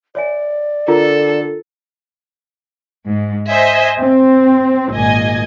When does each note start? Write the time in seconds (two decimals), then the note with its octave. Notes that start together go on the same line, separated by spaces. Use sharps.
0.15 C#5 D5 E5 G#5
0.88 D3 F4 A4 A#4 A#5
3.07 G#2
3.50 C5 D#5 E5 G#5
4.00 C4
4.93 G#1 A#2 D#5 G#5